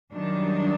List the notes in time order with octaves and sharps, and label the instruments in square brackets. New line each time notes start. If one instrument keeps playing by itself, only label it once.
[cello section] F#2 D#3 G3 D4